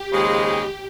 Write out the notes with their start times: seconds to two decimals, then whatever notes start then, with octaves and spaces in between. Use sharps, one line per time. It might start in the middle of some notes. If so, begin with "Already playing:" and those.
Already playing: G4
0.11 D#2 C#3 F3 G#3